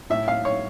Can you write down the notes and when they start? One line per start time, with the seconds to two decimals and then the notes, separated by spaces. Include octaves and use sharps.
0.10 A2 E5
0.28 F5
0.45 C#5